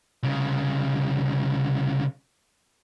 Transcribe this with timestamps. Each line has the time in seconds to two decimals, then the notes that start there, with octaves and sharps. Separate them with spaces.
0.23 C2 C#3